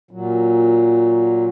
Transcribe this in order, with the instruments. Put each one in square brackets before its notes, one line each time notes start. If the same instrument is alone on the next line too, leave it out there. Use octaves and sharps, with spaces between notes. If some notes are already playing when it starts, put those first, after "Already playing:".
[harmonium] A#2 F#3